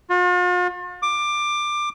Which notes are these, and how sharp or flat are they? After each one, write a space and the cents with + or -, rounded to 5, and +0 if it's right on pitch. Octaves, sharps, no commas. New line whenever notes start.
F4 +45
D6 +15